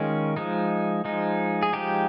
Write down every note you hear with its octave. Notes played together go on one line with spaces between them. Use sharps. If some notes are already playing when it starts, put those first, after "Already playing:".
Already playing: D#3 G#3 C#4 F4 G#4
F3 G#3 D#4
F3 G#3 D#4
G#4
F3 G#3 D#4 G4